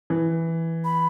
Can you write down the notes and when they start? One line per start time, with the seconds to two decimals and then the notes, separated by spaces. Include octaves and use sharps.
0.10 E3
0.84 B5